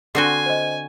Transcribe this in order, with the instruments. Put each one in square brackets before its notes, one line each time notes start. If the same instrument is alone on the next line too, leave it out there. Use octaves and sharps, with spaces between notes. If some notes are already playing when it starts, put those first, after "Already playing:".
[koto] D3 C4 F#4 [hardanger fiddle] G#5 [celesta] C7 G7
[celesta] C5 D#5